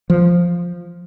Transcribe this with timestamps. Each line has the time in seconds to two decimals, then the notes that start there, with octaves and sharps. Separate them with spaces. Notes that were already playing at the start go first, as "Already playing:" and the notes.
0.10 F3